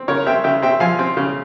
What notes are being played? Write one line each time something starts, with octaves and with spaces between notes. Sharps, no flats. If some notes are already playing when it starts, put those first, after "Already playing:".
Already playing: C4
C#3 A#4 C#5
C4 E5 G5
C#3 E5 G5
C4 E5 G5
F3 F5 G#5
C4
C#3